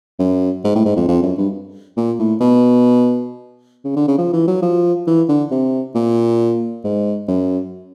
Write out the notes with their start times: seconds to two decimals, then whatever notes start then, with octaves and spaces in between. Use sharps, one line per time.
0.19 F#2
0.64 G#2
0.75 A2
0.85 G#2
0.97 F2
1.08 F2
1.23 F#2
1.38 G2
1.97 A#2
2.19 A2
2.41 B2
3.85 C#3
3.96 D3
4.08 C#3
4.18 F3
4.33 E3
4.48 F#3
4.62 F3
5.07 E3
5.29 D3
5.51 C3
5.95 A#2
6.84 G#2
7.28 F#2